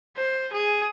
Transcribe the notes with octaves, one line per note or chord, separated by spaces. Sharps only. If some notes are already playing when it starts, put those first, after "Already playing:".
C5
G#4